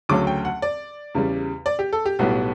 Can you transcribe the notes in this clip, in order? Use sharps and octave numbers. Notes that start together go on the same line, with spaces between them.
D2 C#3 F#3 A3 C#4 D6
G5
F#5
D5
E2 C#3 G3
D5
G4
A4
G4
B1 A2 G3 B3 F#4